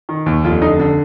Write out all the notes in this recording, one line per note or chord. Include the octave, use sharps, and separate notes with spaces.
D#3
D#2
F1 F4
D3 D#4
D3